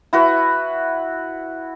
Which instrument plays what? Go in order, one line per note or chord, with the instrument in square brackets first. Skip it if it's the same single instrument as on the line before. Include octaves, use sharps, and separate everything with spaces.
[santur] E4 F#4 B4